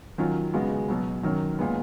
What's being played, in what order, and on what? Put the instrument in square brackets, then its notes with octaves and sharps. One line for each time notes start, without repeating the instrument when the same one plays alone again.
[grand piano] D#3 F#3 C#4 F4
C#3 G#3 B3 F#4
B2 F#3 B3
F#2 D#3 F#3
A#2 G#3 B3